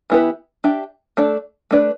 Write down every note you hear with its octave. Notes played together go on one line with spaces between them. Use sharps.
E3 B3 E4 G4 B4
D4 G4 E5
A3 D4 A4 D5
A3 D4 B4 D5